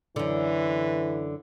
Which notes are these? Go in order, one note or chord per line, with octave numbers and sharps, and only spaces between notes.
F#2 D3 E3